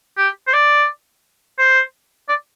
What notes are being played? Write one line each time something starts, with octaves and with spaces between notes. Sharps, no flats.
G4
C5
D5
C5
D5